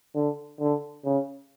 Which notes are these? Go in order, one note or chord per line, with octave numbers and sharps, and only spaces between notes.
D3
D3
C#3